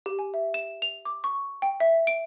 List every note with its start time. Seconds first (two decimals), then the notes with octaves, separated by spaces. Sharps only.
0.06 G4
0.19 G#5
0.34 E5
0.54 E7
0.82 F7
1.05 D6
1.24 C#6
1.62 G5
1.80 E5
2.07 D7